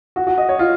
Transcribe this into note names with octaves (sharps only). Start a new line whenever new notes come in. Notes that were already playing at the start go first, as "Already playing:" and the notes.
F#4
F#4
D#5
C#5
F4